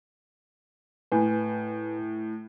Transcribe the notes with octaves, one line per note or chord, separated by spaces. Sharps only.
A2 B4 G#5